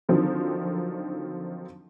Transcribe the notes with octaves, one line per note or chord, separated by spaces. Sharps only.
D3 D#3 F3 F#3 C4